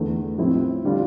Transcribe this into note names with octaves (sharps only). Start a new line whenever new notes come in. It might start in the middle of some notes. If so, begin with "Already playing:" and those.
Already playing: E2 D3 A3 E4
A2 F3 C4 E4
D3 G3 D4 F4